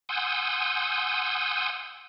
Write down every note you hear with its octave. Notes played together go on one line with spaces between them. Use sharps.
F#5 G#5 C6 D#6 E6 G6